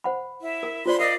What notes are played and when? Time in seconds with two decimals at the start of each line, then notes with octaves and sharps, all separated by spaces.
0.04 C5 F#5 B5
0.41 E4
0.63 A#4
0.86 F4 C5 D5 B5 C6
1.00 A#4 D5 D#5 F5